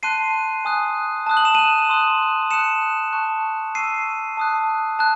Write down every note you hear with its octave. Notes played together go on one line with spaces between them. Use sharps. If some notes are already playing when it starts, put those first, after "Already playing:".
A5 C6 F#6 C7 D#7
G#5 D#6 F#6
A5 D#6 F#6
F#7
E7
D#7 F#7
C6 D#6 F#6
A5 C6 D#6 F#6 C#7 E7
A5 C#6 F#6
A5 C#6 E6 C7 D#7
A5 D#6 F#6
A5 F#6